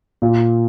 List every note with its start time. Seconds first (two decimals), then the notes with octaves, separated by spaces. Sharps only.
0.22 A#2